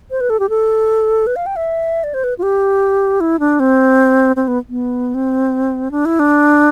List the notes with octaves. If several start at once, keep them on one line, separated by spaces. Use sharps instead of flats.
C5
B4
A4
G4
A4
B4
F5
G5
E5
D5
C5
B4
F4
G4
E4
D4
C4
C4
B3
B3
C4
D4
E4
D4